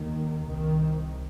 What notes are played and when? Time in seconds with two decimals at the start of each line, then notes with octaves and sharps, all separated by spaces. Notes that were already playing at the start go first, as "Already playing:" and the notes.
Already playing: D#2 D#3
0.46 C2 C3 D#3